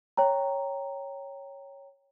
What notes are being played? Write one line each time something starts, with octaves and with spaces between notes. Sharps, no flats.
C#5 G5 A#5